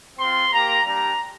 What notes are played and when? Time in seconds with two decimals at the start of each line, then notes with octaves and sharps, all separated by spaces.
0.17 C4 F4 C6
0.51 A#3 G4 A#5
0.84 G3 D4 G4 A#5